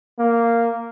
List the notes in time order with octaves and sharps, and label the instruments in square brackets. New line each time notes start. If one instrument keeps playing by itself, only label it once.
[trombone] A#3